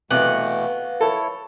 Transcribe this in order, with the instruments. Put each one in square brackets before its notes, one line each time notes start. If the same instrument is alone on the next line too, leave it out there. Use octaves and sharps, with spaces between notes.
[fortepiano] C2 [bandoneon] B2 E3 A3 [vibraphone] B4 F5 [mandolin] F#5
[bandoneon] E4 C#5 [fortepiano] A4